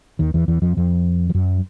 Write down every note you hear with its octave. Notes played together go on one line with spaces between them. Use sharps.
D#2 D#3
E2 E3
E2 E3
F2 F3
F2 F3
F3
F#2 F#3